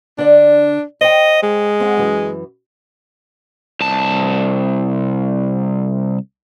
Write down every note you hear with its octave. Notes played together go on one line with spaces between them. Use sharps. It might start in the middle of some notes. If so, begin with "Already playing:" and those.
D3 D4 D5
C5 D#5 G5
G#3
C4 F5 F#5
F#2 E3
C2 A5